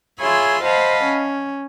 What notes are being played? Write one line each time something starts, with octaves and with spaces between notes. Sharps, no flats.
F4 G#4 C#5 E5 B5 C6
C5 D#5 F5 F#5 A5 B5
C#4